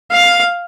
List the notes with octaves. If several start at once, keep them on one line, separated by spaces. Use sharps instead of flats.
F5